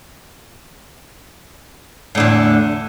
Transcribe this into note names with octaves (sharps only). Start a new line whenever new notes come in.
E2 A2 D3